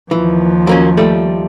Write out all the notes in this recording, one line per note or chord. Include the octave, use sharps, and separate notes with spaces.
D#2 E3 F3
F#3 A#3 C#4
G3 A3 A4